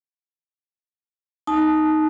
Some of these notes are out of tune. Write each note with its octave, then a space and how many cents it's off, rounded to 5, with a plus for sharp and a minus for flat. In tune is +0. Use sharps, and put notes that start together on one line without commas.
D#4 +0 A5 -25